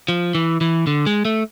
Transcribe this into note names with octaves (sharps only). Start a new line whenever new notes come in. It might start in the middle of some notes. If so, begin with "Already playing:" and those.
F3
E3
E3
D3
G#3
A3